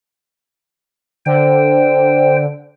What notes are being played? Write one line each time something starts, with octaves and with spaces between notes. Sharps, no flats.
D3 C5 G5